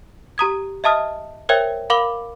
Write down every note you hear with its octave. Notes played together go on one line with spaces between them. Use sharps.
G4 A#5 D#6 G#6
D#5 E5 A5 D#6 F6
A#4 C5 C#5 E5 G5 G#6
A#4 F5 B5 D6 F#7 G7